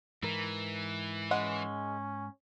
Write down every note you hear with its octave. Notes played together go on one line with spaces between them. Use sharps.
G#2 E3 A#4
G#3 C#4 F#5